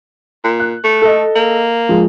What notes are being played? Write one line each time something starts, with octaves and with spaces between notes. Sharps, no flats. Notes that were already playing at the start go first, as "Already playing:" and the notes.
A#2
F#6
A3
A4 D#5
A#3
F3 G#3